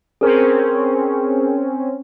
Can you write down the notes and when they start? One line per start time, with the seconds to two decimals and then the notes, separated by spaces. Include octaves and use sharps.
0.21 C4 C#4 G#4 A#4 C5